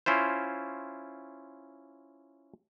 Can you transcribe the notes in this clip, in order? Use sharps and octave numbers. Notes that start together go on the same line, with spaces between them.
C#4 E4 F4 C5